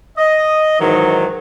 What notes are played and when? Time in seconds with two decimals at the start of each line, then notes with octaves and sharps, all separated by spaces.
0.17 D#5
0.80 G#2 D#3 E3 F#3